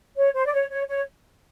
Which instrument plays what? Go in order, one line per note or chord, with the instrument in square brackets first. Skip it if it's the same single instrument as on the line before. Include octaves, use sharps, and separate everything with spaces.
[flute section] C#5
C5
D5
C#5
C#5
C#5